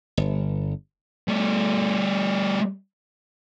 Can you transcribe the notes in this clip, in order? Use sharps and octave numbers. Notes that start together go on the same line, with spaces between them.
G1
G3 A3